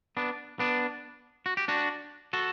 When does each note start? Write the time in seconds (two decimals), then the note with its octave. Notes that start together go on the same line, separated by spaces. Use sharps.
0.17 B3 D4
0.59 B3 D4
1.46 F#4
1.57 G4
1.68 D4 F#4
2.33 F#4 A4